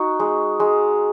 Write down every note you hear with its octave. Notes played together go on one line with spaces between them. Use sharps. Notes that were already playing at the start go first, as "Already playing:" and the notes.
Already playing: D#4 F#4
G#3
G#3